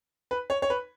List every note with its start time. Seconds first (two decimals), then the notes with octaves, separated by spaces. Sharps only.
0.31 B4
0.50 C#5
0.62 C#5
0.70 B4